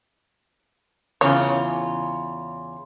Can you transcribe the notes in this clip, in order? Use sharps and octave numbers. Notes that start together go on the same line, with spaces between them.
E2 C#3 F4 C#5